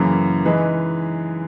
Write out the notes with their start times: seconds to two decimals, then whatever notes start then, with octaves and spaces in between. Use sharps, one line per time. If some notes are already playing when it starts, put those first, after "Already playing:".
Already playing: F#2 C#3 E3 A#3
0.45 E3 G#3 D#4 G#4 B4